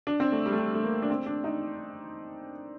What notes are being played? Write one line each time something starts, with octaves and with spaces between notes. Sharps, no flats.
D4
C4
A3
G3
A3
G3
A3
A#3
D4
C4
D4
D#4